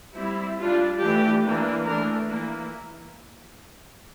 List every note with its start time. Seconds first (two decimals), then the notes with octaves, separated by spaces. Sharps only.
0.17 G3 C4 E4
0.60 G3 D4 F4
1.01 E3 A3 D4 G4
1.44 E3 A#3 D4
1.86 E3 A3 D4 A#4
2.28 E3 A#3 E4